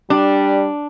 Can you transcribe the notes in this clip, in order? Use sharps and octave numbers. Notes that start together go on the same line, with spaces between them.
G3 D4